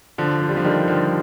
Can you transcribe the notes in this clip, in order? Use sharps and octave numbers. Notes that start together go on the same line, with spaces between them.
D3 F3
F3
G3
D3 F3
D#3 G3
D3 F3